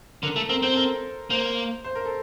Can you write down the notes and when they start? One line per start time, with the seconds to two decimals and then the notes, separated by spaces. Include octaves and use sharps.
0.23 D3 A#4
0.36 A3 A4
0.49 C4 A#4
0.62 C4 C5
0.73 A4
0.77 A#4
1.30 A#3 C5
1.84 C5
1.95 A#4
2.05 A4